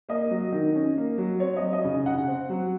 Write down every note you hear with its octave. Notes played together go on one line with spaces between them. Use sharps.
A#3 D#5
F#3
D#3
C#4
A#3
F#3
C4 C#5
D#5
F#3
D#5
C#3
C#3 F#5
C4
F#3